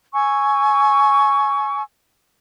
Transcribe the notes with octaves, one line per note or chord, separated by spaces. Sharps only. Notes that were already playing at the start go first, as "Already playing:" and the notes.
G#5 C#6 E6